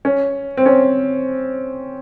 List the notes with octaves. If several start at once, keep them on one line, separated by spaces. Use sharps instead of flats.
C#4
C4
C#4